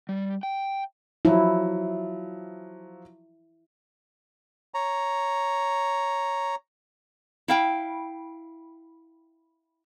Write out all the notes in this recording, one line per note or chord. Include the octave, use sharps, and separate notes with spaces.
G3
G5
F3 F#3 E4
C#5 A#5
E4 F5 G5